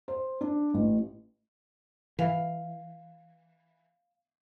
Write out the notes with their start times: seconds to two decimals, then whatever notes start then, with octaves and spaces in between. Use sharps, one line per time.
0.08 C5
0.41 D4
0.74 A1
2.19 E3 F5